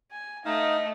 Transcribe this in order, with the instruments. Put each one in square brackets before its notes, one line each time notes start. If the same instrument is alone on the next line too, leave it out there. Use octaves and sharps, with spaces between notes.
[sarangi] G#5
[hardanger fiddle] A3 [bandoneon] D#4 F5 [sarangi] D#5